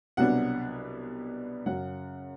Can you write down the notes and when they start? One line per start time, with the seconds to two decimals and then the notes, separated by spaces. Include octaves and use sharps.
0.17 C2 B2 F#3 B3 D4 F#5
1.66 F#2 C#3 F#3 F#5